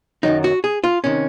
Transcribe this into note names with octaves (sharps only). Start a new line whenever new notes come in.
F#2 D#3 F#3 D#4
F#4
G#4
F4
C3 D#3 C#4